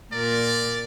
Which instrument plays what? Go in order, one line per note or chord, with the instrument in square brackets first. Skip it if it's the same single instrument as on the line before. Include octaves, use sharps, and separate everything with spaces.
[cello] A#2 A#4 [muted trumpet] D5